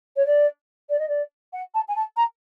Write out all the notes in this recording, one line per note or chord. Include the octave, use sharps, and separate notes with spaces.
C#5
D5
D5
D#5
D5
F#5
A5
G#5
A5
A#5